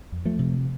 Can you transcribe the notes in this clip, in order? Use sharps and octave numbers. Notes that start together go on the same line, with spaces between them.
F2
F3 A3
C3